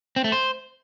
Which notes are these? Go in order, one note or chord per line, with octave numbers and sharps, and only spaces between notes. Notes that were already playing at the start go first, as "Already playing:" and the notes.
C4
A3
C5